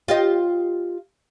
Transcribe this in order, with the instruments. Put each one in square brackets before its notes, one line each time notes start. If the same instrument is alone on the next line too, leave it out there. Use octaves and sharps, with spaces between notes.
[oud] F4 G4 D#5